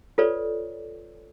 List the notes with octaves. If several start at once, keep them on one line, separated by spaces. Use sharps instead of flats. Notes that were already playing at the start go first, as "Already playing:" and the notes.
F4 A4 B4 C#5 D5